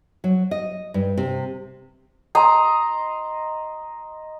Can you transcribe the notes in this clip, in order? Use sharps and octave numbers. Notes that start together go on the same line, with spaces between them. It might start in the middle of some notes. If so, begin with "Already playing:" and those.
F#3
D#5
G2
C3
D#5 A#5 C6